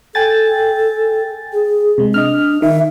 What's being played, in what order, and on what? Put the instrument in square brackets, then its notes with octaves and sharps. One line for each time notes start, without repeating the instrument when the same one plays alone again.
[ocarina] A4 [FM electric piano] G5 G#5 A6
[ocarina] G#4
[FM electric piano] C3 G#3
[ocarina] D4 [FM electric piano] D#5 F6
[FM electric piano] D#3 [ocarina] E5